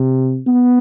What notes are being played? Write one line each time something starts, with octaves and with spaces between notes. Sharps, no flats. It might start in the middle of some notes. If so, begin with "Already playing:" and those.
Already playing: C3
B3